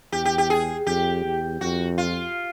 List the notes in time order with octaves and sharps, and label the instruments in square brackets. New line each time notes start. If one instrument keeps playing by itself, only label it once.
[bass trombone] E2 [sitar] G4
[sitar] G4
G4
G#4
[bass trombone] F2 [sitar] G4
[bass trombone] E2
[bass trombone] F2 [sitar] F#4
[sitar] F4